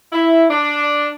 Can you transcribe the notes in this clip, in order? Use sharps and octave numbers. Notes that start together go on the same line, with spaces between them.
E4
D4